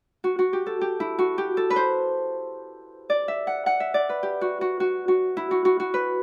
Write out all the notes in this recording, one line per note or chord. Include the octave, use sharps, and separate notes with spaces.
F#4
F#4
G4
A4
G4
E4
F#4
G4
A4
B4
C5
D5
E5
F#5
F#5
E5
D5
B4
G4
F#4
F#4
F#4
F#4
E4
F#4
F#4
F#4
B4